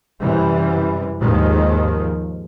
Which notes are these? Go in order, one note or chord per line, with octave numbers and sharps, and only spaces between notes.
F#2 C3 E3 G3
D#2 G#2 D#3 F3 G#3